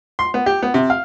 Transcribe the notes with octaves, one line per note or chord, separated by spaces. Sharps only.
C6
B3
G4
B3
C3
F5